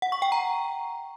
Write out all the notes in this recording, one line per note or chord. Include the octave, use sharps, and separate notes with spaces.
F#5
C#6
G5
A#5